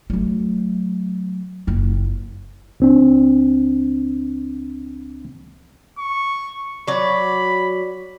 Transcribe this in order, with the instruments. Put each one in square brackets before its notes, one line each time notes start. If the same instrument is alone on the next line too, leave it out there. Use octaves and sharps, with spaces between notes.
[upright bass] F#3 A3
F#1 F4
[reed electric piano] C#2 C4 D4
[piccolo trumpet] C#6
[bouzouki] F#3 D5 [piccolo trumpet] B5